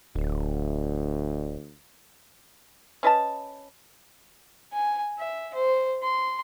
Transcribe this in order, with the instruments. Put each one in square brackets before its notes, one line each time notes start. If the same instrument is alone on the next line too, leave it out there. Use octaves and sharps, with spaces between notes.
[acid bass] D1 [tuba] D2
[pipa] C#4 B4 D#5 A5
[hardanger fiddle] G#5
E5
C5
C6